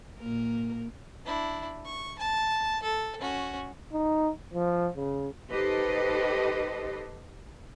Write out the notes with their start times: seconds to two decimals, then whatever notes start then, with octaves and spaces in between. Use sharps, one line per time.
0.18 A#2 A#3 A#4
1.26 D4 E4
1.85 C#6
2.19 A5
2.83 A4
3.21 C#4 F#4
3.93 D#4
4.54 F3
4.97 C#3
5.50 D#4 G4 A4 B4 C5 D#5